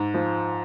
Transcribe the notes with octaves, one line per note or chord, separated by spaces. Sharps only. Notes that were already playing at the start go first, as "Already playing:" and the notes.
Already playing: G#2
F3